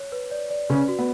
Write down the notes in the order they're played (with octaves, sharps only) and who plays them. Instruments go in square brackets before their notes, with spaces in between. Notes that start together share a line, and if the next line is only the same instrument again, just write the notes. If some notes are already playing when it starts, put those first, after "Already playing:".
Already playing: [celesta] C#5
B4
D5
D5
[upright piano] C#3 C#4 [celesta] B4
[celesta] F#4
[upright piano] B3